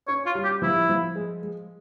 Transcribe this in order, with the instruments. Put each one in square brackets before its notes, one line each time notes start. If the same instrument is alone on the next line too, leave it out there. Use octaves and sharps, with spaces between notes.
[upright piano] C#4 [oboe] C#5
[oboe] F4
[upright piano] G3
[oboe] G4
[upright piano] F3 [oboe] E4
[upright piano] F3
G#3
G#3